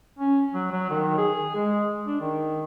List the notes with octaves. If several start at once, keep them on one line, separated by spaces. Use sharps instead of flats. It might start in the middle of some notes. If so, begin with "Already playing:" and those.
C#4
F#3
F#3
D#3
G#4
G#3
D4
D#3